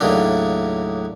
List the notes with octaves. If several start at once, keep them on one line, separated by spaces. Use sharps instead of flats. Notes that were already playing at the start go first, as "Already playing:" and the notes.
D#2 A2 C#3 F#3 D4